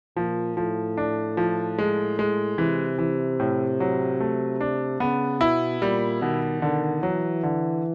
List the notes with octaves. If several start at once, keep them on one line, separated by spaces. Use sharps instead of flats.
A#2 F3
A2 F3
D4
F3
G#3
G#3
C3 E3
E3
A2
F#3
A3
D4
C#3 B3
B2 E4
A#2 G3
B2 D#3
D3 D#3
E3 F#3
D3